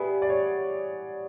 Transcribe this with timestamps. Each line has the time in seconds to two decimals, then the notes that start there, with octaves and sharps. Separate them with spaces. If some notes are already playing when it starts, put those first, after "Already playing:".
Already playing: G3 B3 E4 G#4 B4
0.22 D5
0.29 C#5